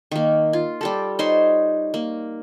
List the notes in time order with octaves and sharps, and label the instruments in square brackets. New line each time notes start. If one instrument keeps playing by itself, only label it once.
[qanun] D#3 A#3
F4
G3 G4 A4
D#4 C5 C#5 C6
A#3